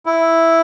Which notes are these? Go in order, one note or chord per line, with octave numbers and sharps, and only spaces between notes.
E4